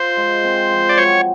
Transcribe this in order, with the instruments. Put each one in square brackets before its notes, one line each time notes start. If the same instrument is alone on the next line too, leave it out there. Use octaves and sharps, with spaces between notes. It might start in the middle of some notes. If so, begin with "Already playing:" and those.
Already playing: [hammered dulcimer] F4 [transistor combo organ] C5
[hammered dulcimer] G#3
C4
F3
[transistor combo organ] D5
[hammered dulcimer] F#3 [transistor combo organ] C#5